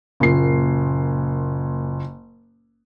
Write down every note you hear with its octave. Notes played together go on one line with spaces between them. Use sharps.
F#1 A#2 C7